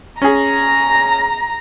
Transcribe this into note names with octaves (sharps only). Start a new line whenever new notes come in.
C#4 G#4 A#5